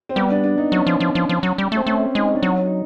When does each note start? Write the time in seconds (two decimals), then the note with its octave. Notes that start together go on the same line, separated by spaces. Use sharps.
0.09 C4
0.16 G3 B3
0.30 D4
0.44 D4
0.58 D#4
0.72 F#3 C#4
0.87 F3
1.00 F3
1.15 F3
1.29 F3
1.43 F#3
1.58 G3
1.72 A3 C4
1.87 A3 C#4
2.15 G#3 D#4
2.28 C#4
2.36 D4
2.42 F#3 D#4
2.66 D#4